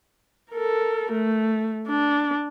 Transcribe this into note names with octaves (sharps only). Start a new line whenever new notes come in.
A4 A#4
A3
D4